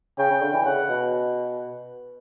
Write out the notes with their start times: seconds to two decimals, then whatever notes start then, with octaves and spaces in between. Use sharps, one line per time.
0.18 C#3 G5
0.30 C#3
0.41 D3
0.53 E3
0.65 C#3 F#5
0.89 B2